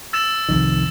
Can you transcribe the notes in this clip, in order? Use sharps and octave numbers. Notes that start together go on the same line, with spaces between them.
E6 A6 E7
C2 F2 D#3